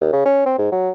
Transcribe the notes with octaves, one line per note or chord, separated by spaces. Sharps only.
D#2
C#3
C#4
C4
G#2
F#3